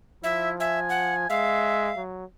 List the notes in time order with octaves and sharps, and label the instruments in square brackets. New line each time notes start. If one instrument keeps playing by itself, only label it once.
[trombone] F3 [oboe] E4 [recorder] E5
[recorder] E5 [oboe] G#5
[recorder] F#5
[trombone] G#3 [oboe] E5 [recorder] F5
[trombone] F#3